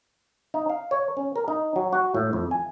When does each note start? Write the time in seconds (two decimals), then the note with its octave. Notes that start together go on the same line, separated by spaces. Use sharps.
0.54 D#4
0.70 F5
0.91 C#5
1.17 C#4
1.36 A#4
1.48 D#4
1.76 F#3
1.93 F#4
2.14 A2
2.33 F2
2.51 G#5